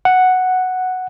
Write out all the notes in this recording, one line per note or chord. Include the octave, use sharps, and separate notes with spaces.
F#5